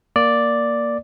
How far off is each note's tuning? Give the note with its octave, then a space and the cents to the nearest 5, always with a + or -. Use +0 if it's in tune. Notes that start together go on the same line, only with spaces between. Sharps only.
A#3 +0 D5 +0